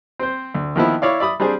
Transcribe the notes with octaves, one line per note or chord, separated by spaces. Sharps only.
C4 C5
D2
D#3 F3 B3 E4
E4 C#5 D5 F5
D5 E5 B5 D#6
G3 C4 D4 G#4